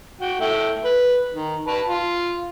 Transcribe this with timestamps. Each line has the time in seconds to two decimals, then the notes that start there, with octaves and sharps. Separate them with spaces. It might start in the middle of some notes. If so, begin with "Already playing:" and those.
0.21 F#4 G5
0.40 A3 E4 G5
0.85 B4
1.33 D#3
1.68 B4 A5 B5
1.88 F4